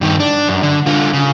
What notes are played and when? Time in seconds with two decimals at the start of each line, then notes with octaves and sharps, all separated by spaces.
0.01 G2 D#3
0.20 D4
0.48 F#2
0.62 D3
0.86 D3 F4
1.13 C#3